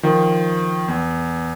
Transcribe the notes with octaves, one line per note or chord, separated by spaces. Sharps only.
D#3 F3
E2